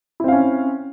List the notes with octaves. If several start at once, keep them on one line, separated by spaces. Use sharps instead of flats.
C4 C#4 E4 F5